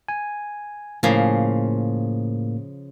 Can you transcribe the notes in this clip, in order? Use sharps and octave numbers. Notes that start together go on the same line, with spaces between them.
G#5
A2 C#3 F3 A#3